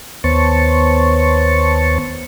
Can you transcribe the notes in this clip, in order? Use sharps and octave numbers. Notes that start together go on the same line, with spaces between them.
D#2 B3 C5 C#5 A5 C#6